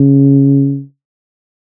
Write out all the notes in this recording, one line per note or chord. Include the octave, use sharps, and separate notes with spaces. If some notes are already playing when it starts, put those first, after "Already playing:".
Already playing: C#3